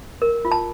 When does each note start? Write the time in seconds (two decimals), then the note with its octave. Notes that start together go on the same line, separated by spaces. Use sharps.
0.22 A#4
0.45 F4
0.52 A5